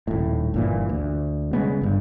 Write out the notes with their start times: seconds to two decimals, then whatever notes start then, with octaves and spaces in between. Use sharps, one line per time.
0.07 D#1 A2
0.54 G1 A#2 E3
0.89 D2
1.53 C#3 G3 G#3 B3
1.81 G1 G2